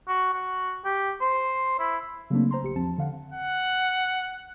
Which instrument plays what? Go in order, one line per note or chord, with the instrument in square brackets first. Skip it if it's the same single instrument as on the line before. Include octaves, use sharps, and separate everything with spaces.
[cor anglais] F#4
F#4
G4
C5
E4
[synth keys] C#3 F#3 A3 A#3 C4 D4
C5 A#5 C6
A#1 G4 C#7
E2 F3 C4 A5
D3 F5 F#5
[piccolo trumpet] F#5